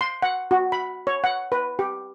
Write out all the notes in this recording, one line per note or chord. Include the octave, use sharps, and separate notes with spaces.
C6
F#5
F#4
B5
C#5
F#5
B4
G4